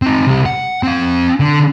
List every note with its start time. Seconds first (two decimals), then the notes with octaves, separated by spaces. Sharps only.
0.02 C4 D#4
0.27 C3 G3
0.46 F#5
0.83 C4 F5
1.40 D3